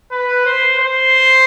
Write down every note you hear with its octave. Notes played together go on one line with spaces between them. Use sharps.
B4
C5
C5